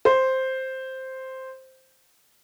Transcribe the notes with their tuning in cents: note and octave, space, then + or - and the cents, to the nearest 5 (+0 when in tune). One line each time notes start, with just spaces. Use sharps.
C5 +0